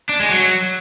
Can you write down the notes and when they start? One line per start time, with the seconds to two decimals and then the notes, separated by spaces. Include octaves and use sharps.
0.09 D4
0.20 G#3
0.30 F#3